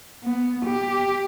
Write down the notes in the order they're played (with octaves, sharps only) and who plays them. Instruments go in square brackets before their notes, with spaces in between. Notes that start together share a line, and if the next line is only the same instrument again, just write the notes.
[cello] B3
G4